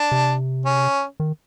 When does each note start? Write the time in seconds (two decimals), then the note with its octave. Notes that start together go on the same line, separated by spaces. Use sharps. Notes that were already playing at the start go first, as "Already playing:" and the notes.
Already playing: D4
0.12 C3
0.65 C#4
1.20 D#3